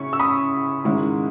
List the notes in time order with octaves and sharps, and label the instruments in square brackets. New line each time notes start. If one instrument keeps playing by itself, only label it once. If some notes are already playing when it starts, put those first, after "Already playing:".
Already playing: [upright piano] C#3 C#4 E4 C#6
E6
B5 D#6
G#2 D#3 G#3 C#4 E4